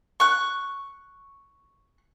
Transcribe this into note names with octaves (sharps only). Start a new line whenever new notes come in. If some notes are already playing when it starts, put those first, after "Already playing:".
C#6 F#6